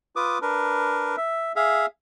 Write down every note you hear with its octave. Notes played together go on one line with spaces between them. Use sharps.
F4 B4 D6 D#6
D4 A#4 B4
E5
G#4 E5 F5